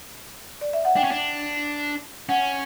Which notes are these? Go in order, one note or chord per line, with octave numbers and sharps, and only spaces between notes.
D5
E5
F#5
D4 G5
C#4
D4
C#4 F#5